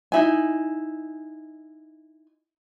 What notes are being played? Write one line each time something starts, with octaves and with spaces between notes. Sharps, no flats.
D#4 E4 G#5